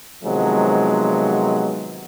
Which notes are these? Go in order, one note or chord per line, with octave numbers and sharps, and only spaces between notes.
C3 D#3 F3 F#3 G#3 B3